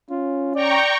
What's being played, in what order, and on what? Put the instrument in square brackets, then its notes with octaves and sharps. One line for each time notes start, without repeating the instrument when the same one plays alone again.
[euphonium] C#4 [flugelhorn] F4
[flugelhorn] D5 [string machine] G5 A#5 C#6